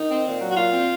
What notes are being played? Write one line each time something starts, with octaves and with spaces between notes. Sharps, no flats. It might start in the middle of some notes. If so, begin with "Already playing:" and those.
Already playing: D#3 D#4
C4
A#2
F#3
F#4
A#2 F4
C4